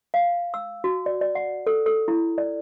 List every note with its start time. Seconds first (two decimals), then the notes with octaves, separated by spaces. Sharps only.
0.14 F5
0.54 E6
0.84 F#4
1.06 D5
1.21 D5
1.35 F#5
1.67 A4
1.86 A4
2.08 E4
2.38 D5